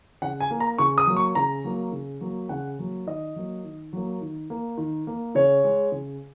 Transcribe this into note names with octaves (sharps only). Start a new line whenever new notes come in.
C#3 F#5
G#5
A#3
A#5
C#3 C#6
D#6
F#3 A#3
C#6
C#3 A#5
F#3 A#3
C#3
F#3 A#3
C#3 F#5
F#3 A#3
D#3 D#5
F#3 A#3
D#3
F#3 A#3
D#3
A#3
D#3
A#3
C#3 C#5
G#3
C#3